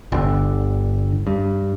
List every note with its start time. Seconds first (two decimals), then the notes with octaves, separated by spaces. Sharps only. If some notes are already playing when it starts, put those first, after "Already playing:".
0.12 G1 D3
1.27 G2